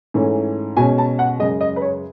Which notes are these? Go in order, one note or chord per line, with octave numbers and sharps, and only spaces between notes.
G#2 E3 A3 C#4
B2 G#3 C#4 G#5
A5
F#5
F#2 C#3 G#3 D#5
D#5
B4
C#5